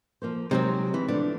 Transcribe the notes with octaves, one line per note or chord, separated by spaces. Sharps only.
F3 A#3 C5
C3 F#3 G#3 C4 D#4 G4
E3
F3 A3 B3 D4